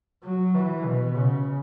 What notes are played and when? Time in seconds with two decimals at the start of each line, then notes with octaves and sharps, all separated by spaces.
0.24 F#3
0.55 E3
0.86 B2
1.16 C#3